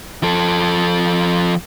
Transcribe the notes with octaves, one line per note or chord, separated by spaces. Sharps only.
F3 A4